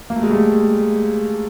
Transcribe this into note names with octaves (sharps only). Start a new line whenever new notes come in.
A#3
A3
G#3
G3 A3